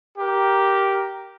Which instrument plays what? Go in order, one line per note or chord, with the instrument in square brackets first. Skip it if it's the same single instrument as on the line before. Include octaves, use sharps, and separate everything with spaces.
[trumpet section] G4 A#4